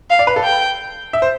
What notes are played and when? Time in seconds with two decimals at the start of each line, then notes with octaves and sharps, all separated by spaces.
0.10 F5
0.19 D5
0.27 B4
0.36 A4
0.44 G5
1.13 E5
1.22 C5